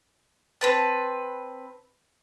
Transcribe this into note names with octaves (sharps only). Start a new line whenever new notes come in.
C4 B4 A5